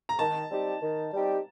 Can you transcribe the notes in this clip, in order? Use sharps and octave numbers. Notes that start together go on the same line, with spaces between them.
A#5
D#3 A5
G3 C4 D#4 G4
D#3
G3 C4 D#4 G4